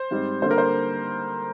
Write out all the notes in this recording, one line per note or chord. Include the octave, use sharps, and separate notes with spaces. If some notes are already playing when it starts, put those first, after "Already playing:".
Already playing: C5
G#2 G3 C4
D3 G3 A#3 C5
A#4
C5